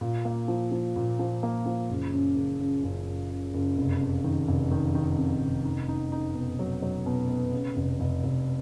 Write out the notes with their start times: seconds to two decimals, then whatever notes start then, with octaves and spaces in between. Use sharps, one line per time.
0.01 A#2
0.25 A#3
0.48 F3
0.71 F3
0.96 A#2
1.19 F3
1.43 A#3
1.66 F3
1.90 F#1
2.13 F#2
2.36 F#1
2.60 C#3
2.83 F#1
3.07 F#1
3.30 C#3
3.54 F#1
3.78 F1
4.01 F2
4.24 D#3
4.48 F1
4.71 D#3
4.95 D#3
5.18 F2
5.41 F1
5.65 D#4
5.88 D#4
6.12 D#4
6.35 B2
6.59 F#3
6.82 F#3
7.06 B2
7.29 B3
7.53 C#3
7.76 F1
8.00 F1
8.24 F1